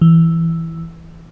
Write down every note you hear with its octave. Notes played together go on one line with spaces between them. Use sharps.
E3